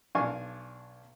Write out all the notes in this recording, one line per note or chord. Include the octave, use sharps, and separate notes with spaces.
B1 D4 F5 G#5 C#6